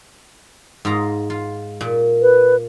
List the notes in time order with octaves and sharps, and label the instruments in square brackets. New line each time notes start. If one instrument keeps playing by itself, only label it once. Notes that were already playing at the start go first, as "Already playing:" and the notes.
[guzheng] G#2 F4 A#5
F4
A#2
[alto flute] B4